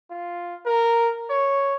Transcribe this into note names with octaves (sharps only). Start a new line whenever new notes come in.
F4
A#4
C#5